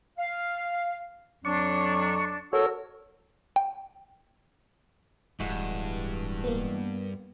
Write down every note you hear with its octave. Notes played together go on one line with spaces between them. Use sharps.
F5
F2 F#3 D4 C#6
F#4 A4 A#4 C#5 E6
G5
D1 G2 E3 G#3 F#4
A#3 B3